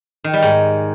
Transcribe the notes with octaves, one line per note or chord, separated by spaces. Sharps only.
D#3
G3
G#2